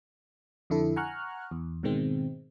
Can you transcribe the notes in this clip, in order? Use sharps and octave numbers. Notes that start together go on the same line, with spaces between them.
F2 D3 E4 A4
F#5 G#5 A#5 C#6 F6 F#6
E2
G#2 B2 D#3 G#3 C4